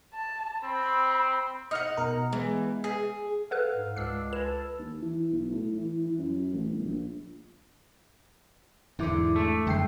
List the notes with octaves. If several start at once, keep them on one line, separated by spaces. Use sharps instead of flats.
A5
C4 B5
D#4 D#5 F#5 F6
B2 A#4
E3 G#3 B3
G#4
A4 B4 F5 F#5 F#6
G#2
C#2 D4 E6 C7
G#3 B4 E7
A4
D#2
E3
B1
A2
E3
E3
F#2
A1
G1
A#1
E2 G#2 D3 E4 D6
A3
F#2 D3 G#3 G5 C7